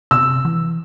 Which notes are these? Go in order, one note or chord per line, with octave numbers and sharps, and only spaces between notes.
C3 E6
E3